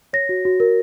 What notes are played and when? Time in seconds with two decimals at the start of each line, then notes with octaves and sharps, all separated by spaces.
0.13 C#5 A#6
0.29 F#4
0.45 F#4
0.60 A#4